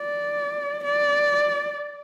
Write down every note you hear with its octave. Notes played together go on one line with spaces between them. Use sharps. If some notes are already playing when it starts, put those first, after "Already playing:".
Already playing: D5
D5